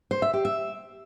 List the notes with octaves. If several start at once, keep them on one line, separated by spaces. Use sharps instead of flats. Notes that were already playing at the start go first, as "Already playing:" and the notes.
C5
E5
G4
E5